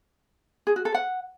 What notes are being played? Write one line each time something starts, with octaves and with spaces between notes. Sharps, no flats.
G#4
F#4
A4
F#5